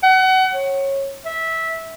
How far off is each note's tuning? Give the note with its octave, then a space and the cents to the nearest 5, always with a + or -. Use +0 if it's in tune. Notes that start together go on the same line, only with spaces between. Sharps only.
F#5 +30
C#5 -20
E5 -15